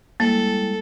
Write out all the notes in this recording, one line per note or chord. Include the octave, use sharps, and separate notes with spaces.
G3 G#3 A#3 E4 A4